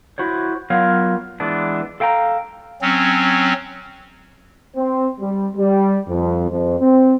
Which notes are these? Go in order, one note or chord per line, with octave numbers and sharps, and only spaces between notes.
E4 F#4 C5 C#5
F#3 B3 F4 A#4 C#5 F5
E3 G#3 B3 D4
A4 F5 G5 A5 A#5
F#3 C4 C#4
C4
G3
G3
F2
F2
C4